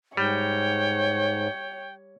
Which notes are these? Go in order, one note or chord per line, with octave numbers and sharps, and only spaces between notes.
G#2 G3 C#5 G5